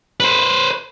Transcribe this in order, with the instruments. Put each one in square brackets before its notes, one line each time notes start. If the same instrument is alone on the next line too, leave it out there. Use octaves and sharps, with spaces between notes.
[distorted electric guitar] B4 C5